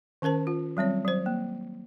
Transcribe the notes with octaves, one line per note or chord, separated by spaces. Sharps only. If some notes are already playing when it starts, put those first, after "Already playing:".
D#3 C#4 A#4 C5 A5
F4
F#3 G3 C4 C#5
F#3 C5
A#3